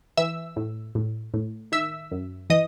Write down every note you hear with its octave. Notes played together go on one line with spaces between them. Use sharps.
E3 E5 E6
A2
A2
A2
D#3 E5 E6
F#2
E3 D#5 D#6